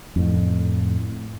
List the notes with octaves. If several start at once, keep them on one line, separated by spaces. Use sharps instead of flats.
F2 A2